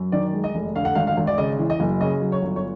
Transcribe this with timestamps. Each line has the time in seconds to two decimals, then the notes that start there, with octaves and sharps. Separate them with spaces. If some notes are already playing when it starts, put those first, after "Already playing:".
Already playing: F#2
0.12 D#3 D5
0.33 G#3
0.44 D#5
0.55 F1
0.76 D3 F5
0.85 F#5
0.95 G#1 F5
1.07 F5
1.17 G#1
1.27 D5
1.38 C#3 D#5
1.59 E3
1.70 D#5
1.80 F#1
2.01 C#3 D#5
2.22 F#3
2.32 C#5
2.43 G1
2.56 C#5